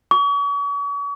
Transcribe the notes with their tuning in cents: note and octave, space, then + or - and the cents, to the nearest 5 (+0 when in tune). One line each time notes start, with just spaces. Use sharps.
C#6 +40